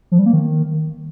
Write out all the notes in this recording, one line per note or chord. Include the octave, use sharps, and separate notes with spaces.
F3
G3
A#3
D#3